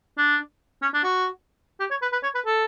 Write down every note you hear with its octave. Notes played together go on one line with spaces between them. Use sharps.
D4
C#4
D4
F#4
G4
C#5
B4
B4
C#5
B4
A4